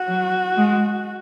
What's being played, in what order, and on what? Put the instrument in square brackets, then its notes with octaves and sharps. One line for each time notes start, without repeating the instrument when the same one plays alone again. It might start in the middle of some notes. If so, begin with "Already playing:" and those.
Already playing: [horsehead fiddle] F#4
[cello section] F#3
G#3